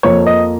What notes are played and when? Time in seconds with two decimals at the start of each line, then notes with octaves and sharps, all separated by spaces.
0.03 F2 F3 A#3 C#5
0.27 D#5